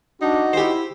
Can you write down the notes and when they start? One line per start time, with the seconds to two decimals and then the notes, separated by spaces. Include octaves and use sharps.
0.22 D4 D#4 F#4
0.53 E4 G4 C5